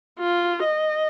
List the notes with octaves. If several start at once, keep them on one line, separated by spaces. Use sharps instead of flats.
F4
D#5